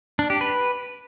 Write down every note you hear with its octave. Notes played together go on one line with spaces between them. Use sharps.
D4
G4
B4